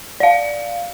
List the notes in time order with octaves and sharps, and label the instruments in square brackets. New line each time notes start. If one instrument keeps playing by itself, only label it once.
[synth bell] D5 F5